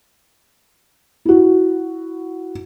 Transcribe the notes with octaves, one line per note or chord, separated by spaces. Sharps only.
E4 F#4